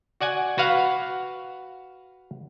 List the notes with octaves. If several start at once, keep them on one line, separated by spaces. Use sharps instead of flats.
F#4 D5 F#5 G#5
F#4 B4 F5 F#5